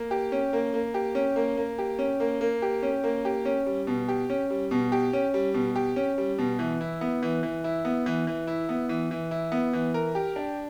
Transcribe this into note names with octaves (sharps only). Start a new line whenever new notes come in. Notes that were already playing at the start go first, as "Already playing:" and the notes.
Already playing: A#3
G4
C#4
A#3
A#3
G4
C#4
A#3
A#3
G4
C#4
A#3
A#3
G4
C#4
A#3
G4
C#4
G3
B2
G4
C#4
G3
B2
G4
C#4
G3
B2
G4
C#4
G3
B2
E3
E4
B3
E3
E3
E4
B3
E3
E3
E4
B3
E3
E3
E4
B3
E3
A#4
G4
D4